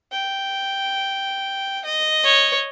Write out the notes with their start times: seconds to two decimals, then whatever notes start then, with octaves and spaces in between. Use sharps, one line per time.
0.12 G5
1.85 D#5
2.25 C#5